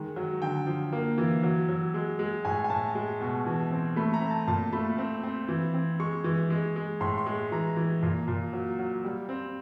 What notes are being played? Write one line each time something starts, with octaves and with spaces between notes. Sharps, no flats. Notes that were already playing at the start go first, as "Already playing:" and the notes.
Already playing: D#3 G#3
F#3
D3 G5
F3
A#3
E3
F#3
F#3
G#3
G#3
A2 G#5
G#5
A2 A5
G#3
B2
E3
C4
A3 B5
A#5
C4
A5
A#2 A5
A3 B5
C4
C4
E3
C4
G#3 C#6
E3
G#3
G#3
A2 C6
C6
G#3
E3 A#5
E3
A#2
A#2
F#3
F#3
G3
C4